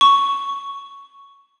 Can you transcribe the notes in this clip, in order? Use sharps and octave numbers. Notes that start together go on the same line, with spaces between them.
C#6